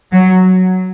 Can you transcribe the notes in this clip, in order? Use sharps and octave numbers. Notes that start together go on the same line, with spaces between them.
F#3